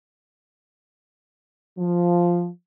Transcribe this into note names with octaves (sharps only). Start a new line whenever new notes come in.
F3